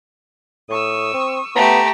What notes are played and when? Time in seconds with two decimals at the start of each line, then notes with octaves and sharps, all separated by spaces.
0.69 A2 C#6 D#6 E6
1.14 C4
1.55 A3 B3 G4 A#5